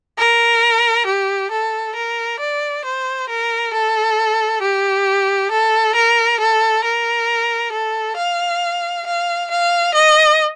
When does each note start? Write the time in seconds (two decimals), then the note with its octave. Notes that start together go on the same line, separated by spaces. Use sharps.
0.18 A#4
1.06 G4
1.51 A4
1.95 A#4
2.40 D5
2.85 C5
3.29 A#4
3.73 A4
4.62 G4
5.51 A4
5.95 A#4
6.40 A4
6.84 A#4
7.72 A4
8.17 F5
9.06 F5
9.51 F5
9.94 D#5